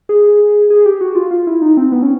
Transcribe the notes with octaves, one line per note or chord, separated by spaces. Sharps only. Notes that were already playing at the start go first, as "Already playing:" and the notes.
G#4
G#4
G4
F#4
F4
F4
E4
D#4
C4
B3
C#4